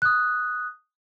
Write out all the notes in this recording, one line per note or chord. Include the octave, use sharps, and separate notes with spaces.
D#6 F#6